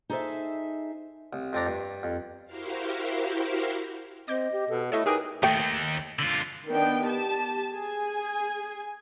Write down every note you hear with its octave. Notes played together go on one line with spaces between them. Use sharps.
D#4 G#4 A4 C5 E5
C2
F2 C4 D4 A#5
G2
F2
E4 F#4 G4 A#4 C5 F5
C4 D#5 D6 G6
G4
B2 A4
A3 E4 A4 C#5 D#5 E5
D#4 G4 G#4 A#4 B4 G5
D#2 D#3 A3 G5
D3 F4
D#3 B3 D4 G5
G4 A5
G#4 G#5